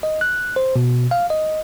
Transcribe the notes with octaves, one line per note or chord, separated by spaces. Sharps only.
D#5
F#6
C5
B2
F5
D#5